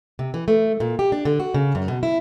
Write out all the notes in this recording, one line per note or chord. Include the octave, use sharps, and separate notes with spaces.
C3
E3
A3
A#2
G4
D4
D3
F#4
C#3
F#2
B2
E4